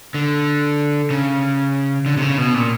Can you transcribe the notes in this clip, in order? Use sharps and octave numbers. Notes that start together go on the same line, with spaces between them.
D3
C#3
D3
C3
C#3
B2
A#2